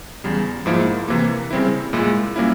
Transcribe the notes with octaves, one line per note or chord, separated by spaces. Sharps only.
E2 C#3 G3
G#2 F3 A#3 E4
C3 E3 A#3
C#3 G3 C4 E4
A#2 G#3 E4
A#2 G3 A#3 C#4 E4